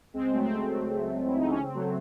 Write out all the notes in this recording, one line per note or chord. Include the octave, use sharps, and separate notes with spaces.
C#2 G#3 C4
F#3 A3
C4
C#2 F#3 A3
F#3 A3
C#2
E3 E4
D#4
C#4
C#3
C4
F#3 A3